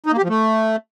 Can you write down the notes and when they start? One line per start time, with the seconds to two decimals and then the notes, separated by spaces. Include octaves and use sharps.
0.06 D#4
0.12 A#3
0.18 G4
0.24 F3
0.29 A3